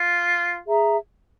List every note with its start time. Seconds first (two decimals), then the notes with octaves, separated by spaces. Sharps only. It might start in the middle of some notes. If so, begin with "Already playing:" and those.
Already playing: F4
0.67 G#4 E5 A#5